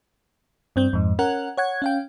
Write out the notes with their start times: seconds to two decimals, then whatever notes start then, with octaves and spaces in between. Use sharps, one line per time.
0.76 G2 C4 G6
0.93 F2 G#2
1.19 C#4 A#4 F#5 F#6
1.57 C#5 F#5 G#6
1.82 C#4 F5 G5